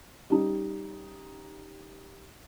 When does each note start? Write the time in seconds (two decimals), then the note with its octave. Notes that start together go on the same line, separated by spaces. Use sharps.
0.30 G3 C#4 D#4